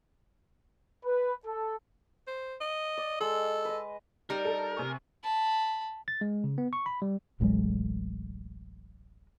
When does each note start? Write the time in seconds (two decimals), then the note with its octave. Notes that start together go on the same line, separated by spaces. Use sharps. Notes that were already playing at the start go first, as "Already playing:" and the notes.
1.05 B4
1.46 A4
2.27 C5
2.61 D#5
2.97 D5
3.20 G#3 A4 E6
3.65 B4 D#5
4.30 G3 D#4 G4 A#4
4.45 A4
4.77 C3 G#5 C#6
5.23 A5 B5
6.08 A6
6.21 G#3
6.44 C#3
6.58 B3
6.73 C#6
6.86 B5
7.02 G3
7.40 D1 A1 F#3 G#3